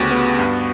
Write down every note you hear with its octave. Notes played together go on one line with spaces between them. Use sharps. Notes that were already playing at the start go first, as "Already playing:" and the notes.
Already playing: D2 C#3 B3 F#4 G4
B3
G2